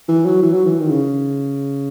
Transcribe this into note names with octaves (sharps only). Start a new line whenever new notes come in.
E3
F#3
E3
F#3
E3
D#3
C#3